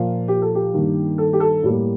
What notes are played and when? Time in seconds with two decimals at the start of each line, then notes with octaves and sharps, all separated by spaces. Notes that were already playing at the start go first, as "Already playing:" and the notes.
Already playing: A#2 F3 A#3 F4
0.28 G4
0.42 A4
0.55 G4
0.73 G2 D#3 A#3
1.18 A4
1.33 G4
1.40 A4
1.63 A2 G3 A#3